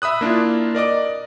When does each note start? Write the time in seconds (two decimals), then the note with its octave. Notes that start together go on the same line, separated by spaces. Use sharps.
0.02 E5 B5 D#6 F#6
0.21 A#3 D4 E4 F4
0.75 A#4 D5 D#5 D6